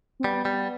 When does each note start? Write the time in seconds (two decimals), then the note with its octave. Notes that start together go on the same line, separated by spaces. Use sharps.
0.20 C4
0.24 G3 B3
0.45 G3